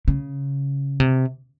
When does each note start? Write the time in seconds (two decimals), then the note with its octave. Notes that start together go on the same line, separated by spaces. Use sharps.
0.08 C#3
1.00 C3